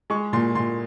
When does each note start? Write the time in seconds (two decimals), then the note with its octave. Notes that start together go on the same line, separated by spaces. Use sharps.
0.10 G#3 C#6
0.33 A#2 C6
0.55 A#2 C6